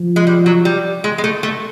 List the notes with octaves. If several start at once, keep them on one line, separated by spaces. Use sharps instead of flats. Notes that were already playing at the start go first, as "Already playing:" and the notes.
Already playing: F3
G#3
G3
F#3
G3
G#3
G#3
A3
A3